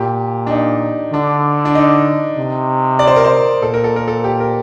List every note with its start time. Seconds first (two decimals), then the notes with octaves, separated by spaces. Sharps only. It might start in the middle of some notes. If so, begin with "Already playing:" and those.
Already playing: A#2 G4
0.47 D4
0.50 D#4
1.13 D3 D4
1.65 D4
1.75 D#4
2.38 C3
2.99 D5
3.07 C5
3.16 A#4
3.25 C5
3.61 A#2 A4
3.74 A#4
3.84 A4
3.96 A#4
4.08 A4
4.24 G4
4.40 A#4